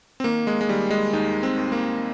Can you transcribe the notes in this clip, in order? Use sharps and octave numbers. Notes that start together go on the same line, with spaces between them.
C4
D#3 A#3
G#3
G#3
D#3 G3
G#3
D#2 D#4
C4
D#2
A#3